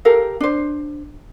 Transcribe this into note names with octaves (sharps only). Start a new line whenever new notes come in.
G4 A4 A#4 F5
D4 C5